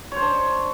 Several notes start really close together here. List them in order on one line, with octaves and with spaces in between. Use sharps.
C#5 C5 D4